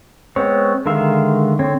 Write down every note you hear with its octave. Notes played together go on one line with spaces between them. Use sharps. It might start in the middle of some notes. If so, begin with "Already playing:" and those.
G#3 B3 C4 C#5
D3 D#3 G#3 E5 F5
D3 C4 C#5